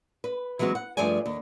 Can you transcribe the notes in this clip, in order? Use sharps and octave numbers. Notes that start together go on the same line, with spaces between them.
B4
E3 F#3 G#3 C4 F#4
F#5
G2 F3 A3 G#4 D5 G#5
D#2